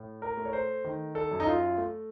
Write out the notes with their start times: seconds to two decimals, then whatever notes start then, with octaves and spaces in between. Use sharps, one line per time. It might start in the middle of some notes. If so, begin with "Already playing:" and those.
Already playing: A2
0.22 A#4
0.37 A3
0.45 C#5
0.53 C5
0.84 D#3
1.15 A4
1.31 F#2
1.40 D#4
1.47 F4
1.78 A3